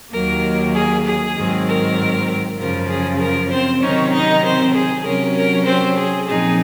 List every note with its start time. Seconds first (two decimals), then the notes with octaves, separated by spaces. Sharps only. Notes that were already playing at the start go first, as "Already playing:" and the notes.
0.12 D#2 D#3 F#3 A#3 A#4
0.75 G#4
1.05 G#4
1.36 G#2 D#3 F#3 C4
1.67 A#4
2.59 F#2 C#3 F3 A#4
2.89 G#4
3.20 A#4
3.51 C4 C5
3.82 C3 D#3 F#3 C4 C#4 D#4 C#5
4.12 D#4 D#5
4.43 C4 C5
4.74 G#4
5.05 C3 F#3 C#4 A#4
5.36 A#4
5.66 C4 C5
5.97 G#4
6.28 A#2 F3 C4 D#4 G#4